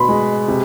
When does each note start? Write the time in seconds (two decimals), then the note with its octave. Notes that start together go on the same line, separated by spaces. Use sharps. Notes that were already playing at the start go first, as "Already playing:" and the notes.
Already playing: B2 B5 C6
0.09 G#3
0.48 C3